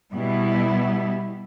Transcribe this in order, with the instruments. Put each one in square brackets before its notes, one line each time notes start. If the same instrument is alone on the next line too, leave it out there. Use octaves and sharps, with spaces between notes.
[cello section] B2 G3 B3 E4